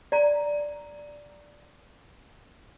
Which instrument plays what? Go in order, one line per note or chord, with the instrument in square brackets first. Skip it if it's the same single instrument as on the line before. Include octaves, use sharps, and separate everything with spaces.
[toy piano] D5 A#5